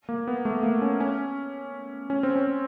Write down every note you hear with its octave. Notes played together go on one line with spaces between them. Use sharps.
A#3
B3
A3
A#3
C#4
C#4
C#4
C4
C#4